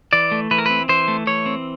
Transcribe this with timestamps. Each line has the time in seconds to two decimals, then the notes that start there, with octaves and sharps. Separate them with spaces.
0.13 E3 D5
0.32 A3
0.51 E3 B4
0.58 A#4
0.66 C4 B4
0.89 E3 C5
1.08 A3
1.27 E3 C#5
1.46 C4